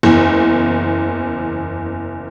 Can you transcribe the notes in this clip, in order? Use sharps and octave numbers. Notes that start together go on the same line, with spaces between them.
F#1 E2